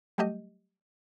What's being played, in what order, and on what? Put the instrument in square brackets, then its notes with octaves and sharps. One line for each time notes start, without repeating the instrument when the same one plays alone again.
[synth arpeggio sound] F#3 G3 A3 G4 D#5